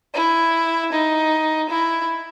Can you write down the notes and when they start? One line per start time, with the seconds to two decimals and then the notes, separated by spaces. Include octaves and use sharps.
0.14 E4
0.92 D#4
1.69 E4